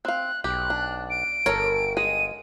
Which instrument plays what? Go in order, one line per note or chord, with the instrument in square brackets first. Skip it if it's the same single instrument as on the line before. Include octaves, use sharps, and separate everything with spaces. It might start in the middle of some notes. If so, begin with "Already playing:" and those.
[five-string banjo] C4 F5 [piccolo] F#6
[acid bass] B1 [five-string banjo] G4 [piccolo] F#6
[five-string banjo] D4
[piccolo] D7
[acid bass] G1 [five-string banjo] A4 C#5 [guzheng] A#4
[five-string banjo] G#3 G#4 D#5 [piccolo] D#7